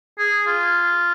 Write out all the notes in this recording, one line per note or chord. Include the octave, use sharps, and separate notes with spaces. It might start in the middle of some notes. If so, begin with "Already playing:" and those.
G#4
F4